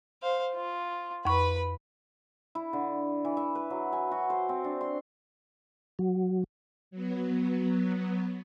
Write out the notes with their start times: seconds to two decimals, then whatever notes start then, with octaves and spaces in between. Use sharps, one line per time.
0.22 C5 F5
0.54 F4
1.25 F2 B4 B5 C#6
2.55 E4
2.73 D3
3.25 E3
3.37 E5
3.55 B4
3.70 F#3
3.92 G#5
4.11 F#4
4.30 C5
4.49 C4
4.64 D4
4.81 C6
5.99 F#3
6.91 F#3 B3